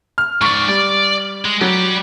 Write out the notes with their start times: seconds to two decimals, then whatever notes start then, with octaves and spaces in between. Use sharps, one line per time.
0.18 F6
0.42 G#2 D5 C#6 F6
0.68 G3 D5
1.45 G#3
1.61 F#3 G3 G4